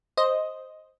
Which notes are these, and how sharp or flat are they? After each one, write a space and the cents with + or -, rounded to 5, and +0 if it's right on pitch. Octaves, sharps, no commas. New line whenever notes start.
C5 +0 D#5 +0